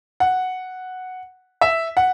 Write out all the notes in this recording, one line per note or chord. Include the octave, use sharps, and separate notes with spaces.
F#5
E5
F#5